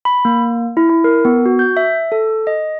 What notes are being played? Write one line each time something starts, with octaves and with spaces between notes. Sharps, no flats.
B5
A#3
E4
E4
A#4
B3
F#4
G6
E5
A4
D#5